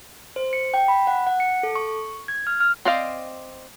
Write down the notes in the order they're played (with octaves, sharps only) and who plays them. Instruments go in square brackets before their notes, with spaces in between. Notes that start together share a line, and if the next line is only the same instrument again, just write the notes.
[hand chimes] C5
C#7
G5
B5
F#5
F#5
C#7
A4
C#6
G#6
F6
F6
[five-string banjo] C4 C5 D5 D#5 F5